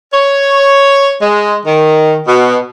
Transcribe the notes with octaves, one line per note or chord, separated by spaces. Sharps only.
C#5
G#3
D#3
B2